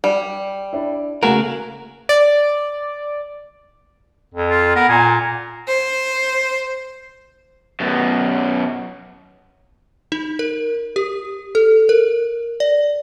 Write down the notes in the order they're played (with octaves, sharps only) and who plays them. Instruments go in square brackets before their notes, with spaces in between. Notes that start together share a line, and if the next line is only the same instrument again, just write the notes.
[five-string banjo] G3
[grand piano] D4 E4
[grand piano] C#3 A#3 [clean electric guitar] A3 G#4 A#4 [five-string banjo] F#4
[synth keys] D5
[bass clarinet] F2
[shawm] F4
[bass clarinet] B3 [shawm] A#4
[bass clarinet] A#2 [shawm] G#5
[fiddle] C5
[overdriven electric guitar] F#2 B2
[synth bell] D#4
A#4
G4
A4
A#4
D5